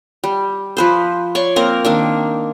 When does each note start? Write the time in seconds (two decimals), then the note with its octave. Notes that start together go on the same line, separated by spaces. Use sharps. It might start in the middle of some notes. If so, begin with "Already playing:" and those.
0.24 G3
0.77 F3 B4 C5
1.35 C#5 D5 C6 C#6
1.56 A#3 C4 A#4
1.85 D#3 A#3 D4